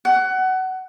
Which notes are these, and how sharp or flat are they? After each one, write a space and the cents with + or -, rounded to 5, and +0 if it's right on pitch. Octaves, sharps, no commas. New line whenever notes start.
F#5 +20